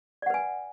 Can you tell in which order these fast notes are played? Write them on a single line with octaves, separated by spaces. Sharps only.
D5 F#5 B4 G#5